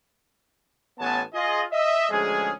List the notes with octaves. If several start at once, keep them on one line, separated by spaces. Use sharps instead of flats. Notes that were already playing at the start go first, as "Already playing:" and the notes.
A1 A2 B3 C#5 G#5 A5
F4 G#4 D#5
D#5 E5
D2 F3 G#3 C#4 G#4